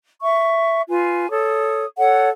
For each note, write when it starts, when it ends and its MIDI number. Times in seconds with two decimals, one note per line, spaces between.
0.21 0.83 76
0.21 0.83 85
0.89 1.28 65
0.89 1.28 71
0.89 1.28 80
1.30 1.84 69
1.30 1.84 73
1.30 1.84 87
1.98 2.29 69
1.98 2.29 73
1.98 2.29 78